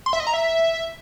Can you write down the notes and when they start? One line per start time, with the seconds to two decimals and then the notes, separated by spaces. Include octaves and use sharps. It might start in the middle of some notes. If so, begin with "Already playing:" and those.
0.06 C6
0.13 E5
0.20 D#5
0.27 A#5
0.34 E5